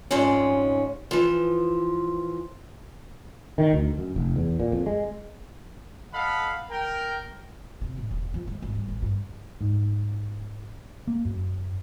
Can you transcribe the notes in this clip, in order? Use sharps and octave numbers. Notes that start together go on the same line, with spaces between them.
F2 G#2 G3 G#3 C#4
E3 F3
D#3
D2
F#2
F1
E2
A#2
F2
G#3
A4 D#5 F5 F#5 B5
A#4 G5
C3
A2
E1
F3
G#3
G#1
G3
A1
G2
G#2
A#3
F#2